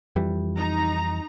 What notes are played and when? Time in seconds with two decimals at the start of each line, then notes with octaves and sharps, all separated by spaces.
0.16 F2 E3 G3
0.56 D#4 A#5